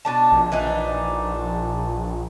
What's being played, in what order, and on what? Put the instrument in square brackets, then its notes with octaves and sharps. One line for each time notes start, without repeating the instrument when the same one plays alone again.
[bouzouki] B2 D4 A5
[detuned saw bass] A#1
[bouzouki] E3 D4 D#4